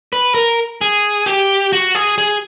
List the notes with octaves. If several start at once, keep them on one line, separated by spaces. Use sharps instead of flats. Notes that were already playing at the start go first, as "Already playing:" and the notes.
B4
A#4
G#4
G4
F#4
G#4
G#4